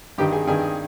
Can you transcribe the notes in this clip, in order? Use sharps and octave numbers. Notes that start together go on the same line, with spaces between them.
G2 D#3 G4
G#4
G2 D#3 G#4